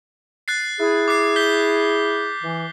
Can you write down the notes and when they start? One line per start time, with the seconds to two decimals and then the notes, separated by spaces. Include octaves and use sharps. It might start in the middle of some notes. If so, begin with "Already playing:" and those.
0.48 F#6 A6 C7
0.80 E4 G#4
1.08 D6 F#6 C7
1.36 G6 B6 G7
2.43 E3